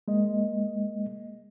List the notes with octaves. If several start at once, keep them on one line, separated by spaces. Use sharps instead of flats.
G#3 A#3 D#5